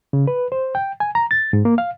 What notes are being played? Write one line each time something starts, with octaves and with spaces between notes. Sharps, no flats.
C#3
B4
C5
G5
G#5
A#5
A6
G#2
A#3
F5